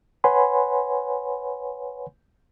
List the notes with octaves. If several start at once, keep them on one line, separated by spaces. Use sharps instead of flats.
B4 C#5 F#5 G#5 B5 C6